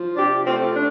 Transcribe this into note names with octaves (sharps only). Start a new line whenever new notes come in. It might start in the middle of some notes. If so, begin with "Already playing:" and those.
Already playing: F3
C3 D4 G4
A3 C4 F4
D4